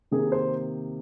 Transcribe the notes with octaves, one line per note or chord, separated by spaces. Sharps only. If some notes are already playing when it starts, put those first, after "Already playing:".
C3 D#3 A#3 G#4
C5